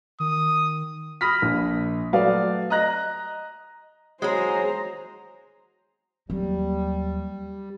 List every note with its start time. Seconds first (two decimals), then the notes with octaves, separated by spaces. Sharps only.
0.20 D#3 D#6
1.21 B5 D#6 F6 A#6 B6
1.42 A#1
2.13 F#3 A3 F#4 B4 D5 F5
2.70 D#5 A#5 F#6 A#6
4.22 F#3 G#3 G#4 C5 A#5
6.30 D#2 F#3 G3